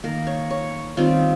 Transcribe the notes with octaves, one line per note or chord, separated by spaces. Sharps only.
D#3 A#3 A#4
C#5
C#5
D#3 G3 C4 F4